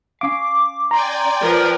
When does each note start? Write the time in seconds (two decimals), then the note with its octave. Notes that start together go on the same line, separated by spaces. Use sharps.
0.21 C#4 F5 D6
0.91 D5 G5 G#5 A#5 C6
1.42 F3 A#4 B4